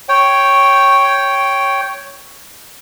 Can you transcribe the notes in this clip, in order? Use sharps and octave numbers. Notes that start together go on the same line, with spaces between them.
C#5 G5